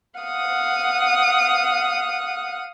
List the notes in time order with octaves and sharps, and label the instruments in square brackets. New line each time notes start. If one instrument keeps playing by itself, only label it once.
[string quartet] F5 F#5 D#6